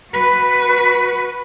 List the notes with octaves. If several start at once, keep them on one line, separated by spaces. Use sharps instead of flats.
F#4 B4